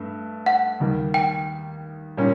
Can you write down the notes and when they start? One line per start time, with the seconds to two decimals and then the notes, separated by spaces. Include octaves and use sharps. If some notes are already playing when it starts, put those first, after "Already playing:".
Already playing: G2 A3
0.46 F#5
0.80 D#2 D#3 G3
1.14 G5
2.17 A#2 G3 A#3 C#4